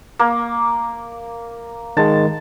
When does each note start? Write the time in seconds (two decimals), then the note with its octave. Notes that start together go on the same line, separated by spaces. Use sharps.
0.19 A#3
1.97 D#3 G#3 A5